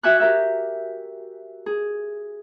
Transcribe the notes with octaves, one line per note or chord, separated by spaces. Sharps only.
F#4 E5 G5 G#5 D6 F#6
G4 A#4 E5
G#4